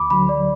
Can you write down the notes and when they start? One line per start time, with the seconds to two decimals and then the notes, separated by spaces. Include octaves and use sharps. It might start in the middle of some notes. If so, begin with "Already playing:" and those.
Already playing: D2 B5 D6
0.10 D3 F#3 B5
0.29 D5